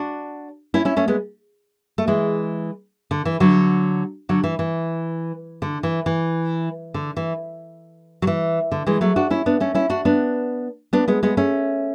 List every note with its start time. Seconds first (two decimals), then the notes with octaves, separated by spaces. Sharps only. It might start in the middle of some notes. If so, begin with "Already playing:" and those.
Already playing: D4 F#4
0.74 C#4 E4
0.85 C#4 E4
0.96 A3 C#4
1.08 G#3 B3
1.98 A3
2.07 E3 G#3
3.11 D3
3.25 E3
3.40 D3 F#3
4.29 D3 F#3
4.44 E3
4.59 E3
5.62 D3
5.83 E3
6.06 E3
6.94 D3
7.17 E3
8.22 F#3
8.27 E3
8.71 D3
8.87 E3 G#3
9.01 F#3 A3
9.16 D4 F#4
9.30 C#4 E4
9.46 B3 D4
9.60 A3 C#4
9.75 C#4 E4
9.90 D4 F#4
10.05 B3 D4
10.93 B3 D4
11.08 G#3 B3
11.23 G#3 B3
11.37 A3 C#4